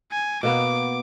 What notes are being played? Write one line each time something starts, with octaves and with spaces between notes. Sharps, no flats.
G#5
B2 A#3 B3 D6